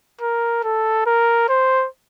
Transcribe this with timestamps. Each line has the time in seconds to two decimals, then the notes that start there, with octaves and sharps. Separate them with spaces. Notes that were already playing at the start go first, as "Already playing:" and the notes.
0.21 A#4
0.64 A4
1.06 A#4
1.49 C5